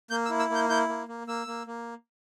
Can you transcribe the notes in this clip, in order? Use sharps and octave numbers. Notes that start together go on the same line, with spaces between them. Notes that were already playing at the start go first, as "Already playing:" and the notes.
A#3 G6
E6
E4
E6
A#3
G6
E4 G6
A#3
A#3
A#3 E6
A#3
A#3